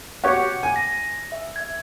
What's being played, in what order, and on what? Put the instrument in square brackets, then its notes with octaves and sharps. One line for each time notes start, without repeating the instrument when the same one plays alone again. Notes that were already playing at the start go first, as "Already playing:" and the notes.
[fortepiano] F#4 G4 C#5 [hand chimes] F#5 D6 C#7
[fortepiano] G#5
[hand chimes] A#6
E5
E5 G#6